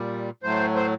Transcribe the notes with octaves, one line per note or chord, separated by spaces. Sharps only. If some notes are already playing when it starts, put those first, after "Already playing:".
Already playing: A#2 G3
A2 F#3 A3 C5
C5